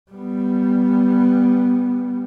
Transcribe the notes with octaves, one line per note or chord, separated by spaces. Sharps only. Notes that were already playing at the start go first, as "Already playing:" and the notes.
G3 B3